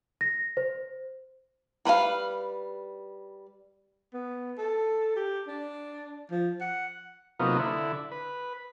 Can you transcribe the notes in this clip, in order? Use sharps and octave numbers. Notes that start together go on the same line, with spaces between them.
A#6
C5
G3 B4 C5 F5
B3
A4
G4
D4
F3
F#5
C3 F#3 A#3 B3 D#4 F4
D3 E4
B4